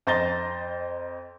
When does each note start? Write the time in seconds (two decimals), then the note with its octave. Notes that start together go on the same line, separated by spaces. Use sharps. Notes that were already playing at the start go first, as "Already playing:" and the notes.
0.07 F2 C5 D#5 A#5 A6 G7